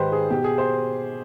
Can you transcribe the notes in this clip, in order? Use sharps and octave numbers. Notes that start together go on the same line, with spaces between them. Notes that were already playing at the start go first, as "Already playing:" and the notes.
Already playing: G#2 D#3 G4 B4 C5
G#4
B2 G4
G#4
C5